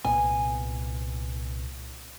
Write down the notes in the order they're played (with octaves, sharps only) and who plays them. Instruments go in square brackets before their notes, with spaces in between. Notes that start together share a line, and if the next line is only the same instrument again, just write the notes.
[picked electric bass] C2 A#2 B3 [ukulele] G#5